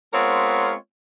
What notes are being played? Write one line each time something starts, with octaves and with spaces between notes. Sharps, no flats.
G#3 B3 C4 F4 A#4 C#5